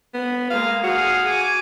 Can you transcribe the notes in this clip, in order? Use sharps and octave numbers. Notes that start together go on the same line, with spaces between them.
B3
G#3 A#3 F5
F#4 G#4 F5
G#5 D6